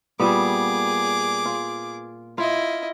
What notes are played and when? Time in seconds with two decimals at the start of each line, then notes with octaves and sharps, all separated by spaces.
0.20 A#2 G3 B3 G#4 D6
1.46 F4
2.38 E4 F4 D#5